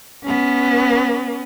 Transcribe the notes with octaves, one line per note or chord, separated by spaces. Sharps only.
B3 C#4